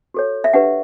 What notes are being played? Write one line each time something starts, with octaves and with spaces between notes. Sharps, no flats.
F#4 A4 C#5
E5
D4 G4 B4 F#5